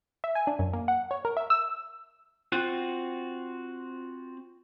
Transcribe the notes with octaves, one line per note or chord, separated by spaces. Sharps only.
E5
G#5
D4
F#2
A#3
F#5
C#5
A#4
E5
E6
C4 F4 F#4 F#6